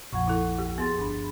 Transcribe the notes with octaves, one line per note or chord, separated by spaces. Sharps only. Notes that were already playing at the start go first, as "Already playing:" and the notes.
A#1 F2 F3 F#5 C#6
E4 A4
D#2 G4
B3 G#4 C6 A6
G1 D4 B5